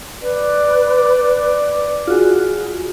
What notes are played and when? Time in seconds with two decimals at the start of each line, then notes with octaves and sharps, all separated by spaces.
0.22 B4 D5
2.07 F4 F#4 G#4